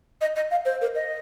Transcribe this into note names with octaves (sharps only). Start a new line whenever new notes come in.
D#5
D#5
F5
C5
A#4
D#5